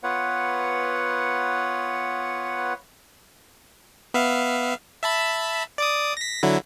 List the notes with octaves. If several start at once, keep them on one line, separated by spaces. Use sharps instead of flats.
B3 F4 B4 C#5 F#5
B3 E5 F5
E5 A5 B5
D5 D6 D#6
A#6 B6
D3 F#3 E4